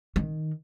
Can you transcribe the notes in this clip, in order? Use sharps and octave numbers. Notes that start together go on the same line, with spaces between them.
D#3